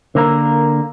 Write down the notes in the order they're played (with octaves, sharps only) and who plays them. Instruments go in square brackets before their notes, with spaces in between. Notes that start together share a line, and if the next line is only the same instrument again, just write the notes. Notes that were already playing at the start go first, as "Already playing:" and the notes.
[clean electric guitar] D3 A#3 A#4